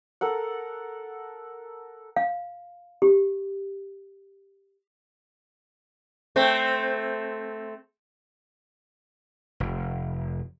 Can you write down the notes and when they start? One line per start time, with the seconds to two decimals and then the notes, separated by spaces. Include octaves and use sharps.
0.21 A4 A#4 F#5
2.16 F5
3.02 G4
6.36 A3 C4
9.60 F1